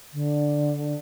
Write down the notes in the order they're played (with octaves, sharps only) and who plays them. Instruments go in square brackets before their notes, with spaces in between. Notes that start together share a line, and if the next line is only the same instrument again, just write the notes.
[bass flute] D3